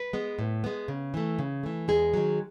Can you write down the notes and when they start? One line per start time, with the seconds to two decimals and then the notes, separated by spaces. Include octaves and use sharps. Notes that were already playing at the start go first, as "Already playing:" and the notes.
Already playing: B4
0.13 G#3 B3
0.39 A2
0.64 G#3 B3
0.88 C#3
1.14 E3 A3
1.39 C#3
1.63 E3 A3
1.88 E2 G#3 G#4
2.14 D#3 F#3